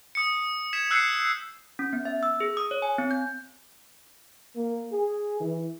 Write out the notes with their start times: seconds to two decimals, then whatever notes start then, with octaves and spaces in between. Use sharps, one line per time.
0.15 D#6 C#7
0.73 G#6 B6 E7
0.91 E6 F#6 G6 C7 C#7
1.79 C#4
1.93 B3
2.05 E5
2.23 E6
2.40 G#4
2.57 D#6
2.71 C#5
2.82 G#5
2.98 C4
3.11 G6
4.56 A#3
4.92 G#4
5.40 E3